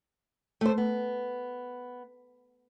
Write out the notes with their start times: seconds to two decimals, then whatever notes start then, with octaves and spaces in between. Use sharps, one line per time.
0.61 A3 C5
0.78 B3